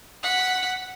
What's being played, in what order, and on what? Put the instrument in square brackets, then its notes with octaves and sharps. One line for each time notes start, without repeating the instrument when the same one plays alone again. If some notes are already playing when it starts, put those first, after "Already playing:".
[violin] F#5 B6